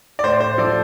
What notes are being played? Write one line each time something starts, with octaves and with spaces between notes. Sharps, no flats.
D5
A2 C5
C5
F3 A4 D5